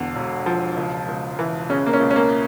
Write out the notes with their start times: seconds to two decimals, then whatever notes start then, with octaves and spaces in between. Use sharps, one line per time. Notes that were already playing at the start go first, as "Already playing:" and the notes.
Already playing: E1 E2 D3
0.15 E1
0.46 F3
0.77 C#2
1.08 C#2
1.39 E3
1.70 C#3 C#4
1.87 A#3
1.93 C#4
2.00 C#2
2.11 C#4
2.16 A#3